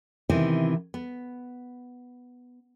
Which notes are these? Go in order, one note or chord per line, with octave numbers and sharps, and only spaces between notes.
C3 D#3 E3 B3 C4 E4
B3